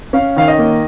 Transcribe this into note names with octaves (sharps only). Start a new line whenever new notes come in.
C#4 F5
D#3 F5
D#5
A#3